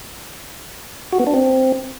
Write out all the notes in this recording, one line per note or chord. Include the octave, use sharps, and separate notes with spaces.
F#4
B3
D4
C4